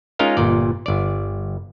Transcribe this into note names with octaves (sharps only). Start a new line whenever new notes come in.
G#3 C#4 D#4 F4 A#4 F5
G1 A#2 D5
G1 D5